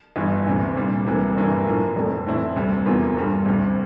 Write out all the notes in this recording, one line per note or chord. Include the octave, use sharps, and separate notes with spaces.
G1 G2 E3
D2 C3 E3
A#2 G3 D4 F4
D2 C3 E3 G3 A#3
G1 G2 E3 A#3 D4
A2 F3 A#3
F1 F2 D3 A3
A2 E3 A3 C4 E4
D2 C3 G3
E2 E3 A#3 F4
G2 D3 G3 C4
D2 C3 G3